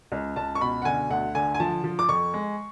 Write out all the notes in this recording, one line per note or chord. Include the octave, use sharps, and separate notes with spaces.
C#2
C#2 A5
C#6
B2 B5
F#5
D3 G#5
D2 F#5
D3 G#5
G#5
F3 A5
F3
D6
F2 C#6
G#3